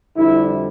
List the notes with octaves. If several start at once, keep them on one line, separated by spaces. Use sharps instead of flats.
F2 D3 G3 E4